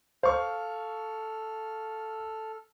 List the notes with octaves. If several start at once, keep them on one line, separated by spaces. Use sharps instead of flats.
A4 C5 F5 C#6 F6